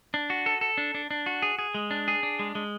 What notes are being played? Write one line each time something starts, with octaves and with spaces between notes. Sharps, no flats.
D4
F#4
A4
A4
D4
D4
D4
F#4
G#4
G#4
G#3
D4
G#4
D4
G#3
G#3